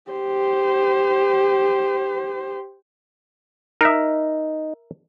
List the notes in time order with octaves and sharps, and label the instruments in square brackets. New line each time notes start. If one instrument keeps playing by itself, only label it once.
[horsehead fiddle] G4 C5
[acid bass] D#4 [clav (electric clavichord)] A#4 E5